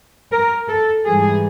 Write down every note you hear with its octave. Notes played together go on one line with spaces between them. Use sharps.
A#4
A4
G#2 E3 G3 G#4